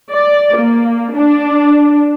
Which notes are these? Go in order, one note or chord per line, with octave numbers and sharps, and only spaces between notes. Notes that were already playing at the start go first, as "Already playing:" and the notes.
D5
A#3
D4